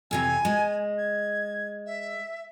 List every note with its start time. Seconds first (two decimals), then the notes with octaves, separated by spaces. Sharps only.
0.11 F2 C3 E3 G#5
0.45 G#3
0.98 G#6
1.86 E5